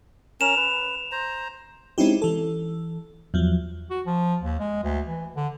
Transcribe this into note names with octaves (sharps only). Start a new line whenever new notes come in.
C#4 A#4 E7 F7
B4
C5 A#5
G#3 C4 C#4 D#4 E4 G4
E3 A4
E2 F3 F#3
F#4
F3
D#2
G#3
D2
E3
D3